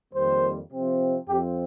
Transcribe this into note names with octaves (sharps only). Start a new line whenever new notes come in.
F2 D#3 G3 A#3 C5
C3 F3 C4
F2 F3 C4 G4